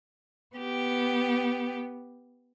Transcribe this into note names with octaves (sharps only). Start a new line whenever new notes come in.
B3 G4